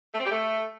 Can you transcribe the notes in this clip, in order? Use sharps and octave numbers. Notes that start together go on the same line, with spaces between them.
A3
C4
G4
A3